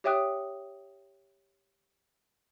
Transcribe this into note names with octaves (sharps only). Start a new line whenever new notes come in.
G4 C#5 E5 G5 D#6 F#6